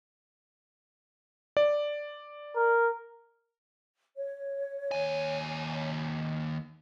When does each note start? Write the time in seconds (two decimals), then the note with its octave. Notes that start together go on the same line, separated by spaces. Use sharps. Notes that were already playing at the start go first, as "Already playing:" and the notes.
1.57 D5
2.56 A#4
4.16 C#5
4.92 D#2 G#5